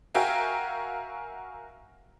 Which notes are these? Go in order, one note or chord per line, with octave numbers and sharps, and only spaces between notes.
F#4 A#4 E5 F5 G5 G#5